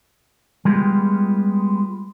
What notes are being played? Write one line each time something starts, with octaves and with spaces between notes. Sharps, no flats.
G3 G#3 B3 F4 G4